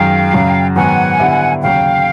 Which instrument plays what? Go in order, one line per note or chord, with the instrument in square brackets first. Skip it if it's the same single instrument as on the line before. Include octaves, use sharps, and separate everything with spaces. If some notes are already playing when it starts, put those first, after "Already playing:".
Already playing: [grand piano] F#2 D#3 G#3 [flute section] F5 G5
[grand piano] F#2 C#3 F#3
[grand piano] G#2 D#3 F#3 B3 [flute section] F#5 G#5
[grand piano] D3 G3 B3 E4 G4
[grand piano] D#2 C#3 F#3 [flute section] F5 G5